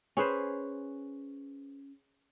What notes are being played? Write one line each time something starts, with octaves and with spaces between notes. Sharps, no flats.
C#4 G#4 B4 C5